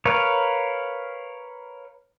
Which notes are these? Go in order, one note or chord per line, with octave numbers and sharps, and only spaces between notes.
A#4 B4 C#5 F5